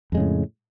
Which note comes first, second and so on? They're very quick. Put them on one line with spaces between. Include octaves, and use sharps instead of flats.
F2 G#3 C#3 A2